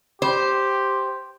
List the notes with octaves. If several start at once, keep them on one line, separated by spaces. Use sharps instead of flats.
G4 C5